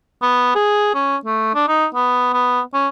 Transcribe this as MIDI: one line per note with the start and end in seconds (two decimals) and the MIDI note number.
0.22 0.52 59
0.55 0.91 68
0.95 1.16 61
1.25 1.51 57
1.55 1.65 62
1.68 1.86 63
1.95 2.33 59
2.33 2.61 59
2.74 2.88 61